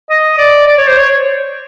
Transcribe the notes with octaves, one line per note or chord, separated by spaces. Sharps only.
D#5
D5
D5
C#5
C5
C#5